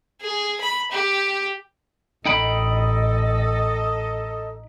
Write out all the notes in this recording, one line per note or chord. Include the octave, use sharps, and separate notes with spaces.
G#4
B5
G4
A1 D#4 A4 D#5 G5 B5